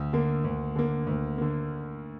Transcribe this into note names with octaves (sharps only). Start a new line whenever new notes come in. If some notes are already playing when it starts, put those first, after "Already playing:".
Already playing: D2
D3 A#3
D2
D3 A#3
D2
D3 A#3